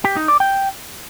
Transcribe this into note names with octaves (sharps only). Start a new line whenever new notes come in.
G4
D#4
D5
G5